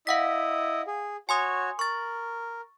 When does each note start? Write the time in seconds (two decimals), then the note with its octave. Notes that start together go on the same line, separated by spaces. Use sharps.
0.07 E4 D#5 F5 F#5 B6
0.87 G#4
1.29 F#4 C#5 G#5 C6 D#6
1.79 A#4 C#6 A6